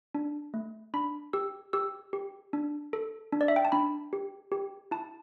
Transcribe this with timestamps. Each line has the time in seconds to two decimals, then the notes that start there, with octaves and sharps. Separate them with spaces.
0.15 D4
0.54 A3
0.94 D4 B5
1.33 G4 E6
1.73 G4 E6
2.13 G4
2.53 D4
2.93 A4
3.32 D4
3.41 D5
3.48 E5
3.56 G5
3.65 A5
3.72 D4 B5
4.13 G4
4.52 G4
4.91 E4 A5